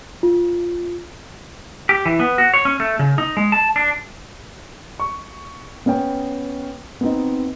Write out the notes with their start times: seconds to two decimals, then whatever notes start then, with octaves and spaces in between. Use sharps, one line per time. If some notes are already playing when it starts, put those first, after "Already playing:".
0.23 F4
1.89 G4
2.06 E3
2.20 B3
2.38 F#4
2.54 C#5
2.65 C#4
2.80 A3
2.99 C#3
3.18 D#4
3.37 G#3
3.52 A5
3.76 D4
5.00 C#6
5.86 B3 C#4 C#5 G5
7.01 B3 C4 D#4